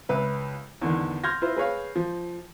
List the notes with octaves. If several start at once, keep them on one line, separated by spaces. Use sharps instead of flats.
C#2 B4 E5
E2 D3 D#3
C6 F6 G6 G#6 A#6
E4 F4 B4 C5
G#4 B4 C#5 F5
F3